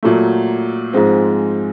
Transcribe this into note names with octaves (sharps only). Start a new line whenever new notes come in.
A#2 F#3 A3
G#2 F3 G#3 C4